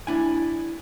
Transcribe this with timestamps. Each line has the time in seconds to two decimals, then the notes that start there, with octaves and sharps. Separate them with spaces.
0.07 D4 E4 G#5